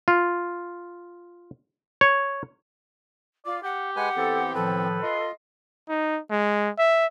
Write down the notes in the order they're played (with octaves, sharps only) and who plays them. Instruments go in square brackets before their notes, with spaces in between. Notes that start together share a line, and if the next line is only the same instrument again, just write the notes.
[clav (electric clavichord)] F4
C#5
[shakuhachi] F4 [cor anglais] D5
[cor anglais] G4 [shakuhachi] F#5
[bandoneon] G#3 B4 G#5 [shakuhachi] F#5
[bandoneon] E3 B3 C4 [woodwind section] A4
[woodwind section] A2 D#3 F3 [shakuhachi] A4 [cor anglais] B4
[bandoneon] F4 [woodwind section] D#5 C6
[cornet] D#4
G#3
E5